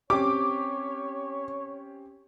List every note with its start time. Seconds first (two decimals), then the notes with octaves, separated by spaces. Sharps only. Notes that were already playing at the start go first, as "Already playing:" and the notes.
0.10 C4 C#4 G4 C#5 D6